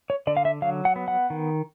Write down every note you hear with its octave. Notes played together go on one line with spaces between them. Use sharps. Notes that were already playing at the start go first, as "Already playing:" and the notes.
C#5
D3 D5
F5
E5
F#3 F5
F#5
B3
F#5
D#3